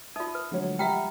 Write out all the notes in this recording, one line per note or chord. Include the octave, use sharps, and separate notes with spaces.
D#4 F4 D5 E5 D#6
B4
D3 F3 F#3 G#3 A3 C#5
G3 E5 F#5 G5 A#5 B5 F6